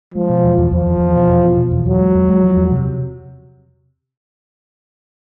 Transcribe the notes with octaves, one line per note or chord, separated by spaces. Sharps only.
F3 G#3
B2
E2
E2
E2 F3
E2
E2
B2
E2
B2
B2
E2
E2 F#3
G#3
E2
G#3
F3
E2
C3